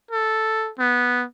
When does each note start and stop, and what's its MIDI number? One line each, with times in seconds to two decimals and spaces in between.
0.11 0.70 69
0.79 1.25 59